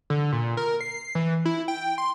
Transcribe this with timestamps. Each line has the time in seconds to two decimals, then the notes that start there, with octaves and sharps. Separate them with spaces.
0.10 D3
0.33 A#2
0.57 A#4
0.81 C7
1.15 E3
1.45 E4
1.68 G5
1.98 C6